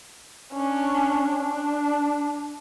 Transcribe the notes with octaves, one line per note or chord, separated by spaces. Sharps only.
C#4 D4
D4